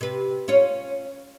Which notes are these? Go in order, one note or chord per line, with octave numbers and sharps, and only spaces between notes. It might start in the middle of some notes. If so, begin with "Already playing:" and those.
C3 B4
C#4 F4 C#5